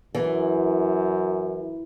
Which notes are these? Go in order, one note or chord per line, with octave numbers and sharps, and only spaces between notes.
F#2 E3